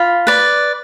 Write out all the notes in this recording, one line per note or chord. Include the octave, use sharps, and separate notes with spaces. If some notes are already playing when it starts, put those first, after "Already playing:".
Already playing: F4 B5
B4 D5